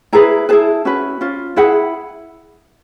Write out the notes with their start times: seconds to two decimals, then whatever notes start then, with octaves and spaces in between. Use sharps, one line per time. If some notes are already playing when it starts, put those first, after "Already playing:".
0.13 E4 G#4 B4 A#5
0.49 E4 G#4 B4 A5
0.85 C#4 F#4 B4
1.21 C#4 F4
1.56 E4 G#4 B4 F#5